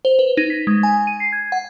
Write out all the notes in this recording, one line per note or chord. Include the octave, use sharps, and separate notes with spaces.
C5
B4
D#4
B6
G#3
G#5
D#7
C7
G#6
F#5